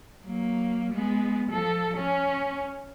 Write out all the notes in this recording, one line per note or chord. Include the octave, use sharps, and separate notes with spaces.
F#3 A#3
G#3 B3
F3 A4
C#4